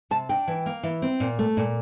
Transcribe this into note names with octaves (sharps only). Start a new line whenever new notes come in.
C3 A5
D4 G5
E3
A#3
E3
C4
A#2
A3
A#2